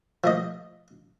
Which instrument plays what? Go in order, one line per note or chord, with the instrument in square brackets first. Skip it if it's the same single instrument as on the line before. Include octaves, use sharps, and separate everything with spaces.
[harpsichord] F3 A3 D#5